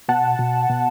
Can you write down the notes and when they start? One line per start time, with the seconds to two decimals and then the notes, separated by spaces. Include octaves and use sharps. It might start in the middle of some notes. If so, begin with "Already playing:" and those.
0.09 B2 F#5 A5
0.39 B2
0.70 B2